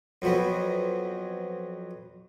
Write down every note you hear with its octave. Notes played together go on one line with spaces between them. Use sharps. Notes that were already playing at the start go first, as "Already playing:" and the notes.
F2 F#3 B3